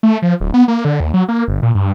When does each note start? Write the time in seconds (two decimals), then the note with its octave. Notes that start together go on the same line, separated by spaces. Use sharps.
0.03 A3
0.22 F3
0.40 D1
0.54 B3
0.68 A#3
0.85 D3
1.00 D#2
1.14 F#3
1.28 A#3
1.48 G1
1.63 A#2
1.75 G2